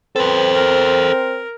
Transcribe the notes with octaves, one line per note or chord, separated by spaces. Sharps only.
C4 A4 B4 C5
A#4